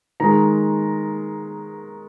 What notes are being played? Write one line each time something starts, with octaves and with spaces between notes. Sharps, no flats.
D#3 G#3 A#5